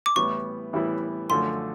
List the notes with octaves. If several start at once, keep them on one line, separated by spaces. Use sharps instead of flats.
D6
A2 E3 G3 B3 E4 C#6
A2 E3 G3 B3 E4
F#2 D3 F3 A3 C6